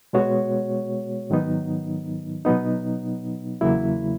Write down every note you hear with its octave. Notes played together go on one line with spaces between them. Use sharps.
B2 G#3 B3 F#4 C#5
G#2 D#3 F#3 B3 D#4
B2 F#3 B3 D#4
E2 C#3 F#3 A#3 E4